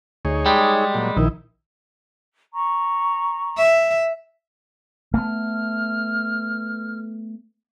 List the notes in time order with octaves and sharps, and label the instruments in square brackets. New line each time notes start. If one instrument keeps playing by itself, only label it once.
[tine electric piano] D2 [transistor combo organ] D#4 G#4 C#5
[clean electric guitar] G3 G#3 [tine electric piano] G5
[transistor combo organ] A#2 F#3
[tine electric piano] A#1 D#3 [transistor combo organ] D#4 E4
[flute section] A#5 C#6
[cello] E5
[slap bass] A3 B3 [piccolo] F6